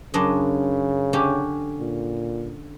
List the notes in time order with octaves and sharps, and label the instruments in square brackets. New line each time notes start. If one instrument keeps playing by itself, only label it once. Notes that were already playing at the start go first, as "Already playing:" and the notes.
[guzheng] F#2 D4 D#5 [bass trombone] C#3
[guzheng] D3 C#4 G4
[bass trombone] A#2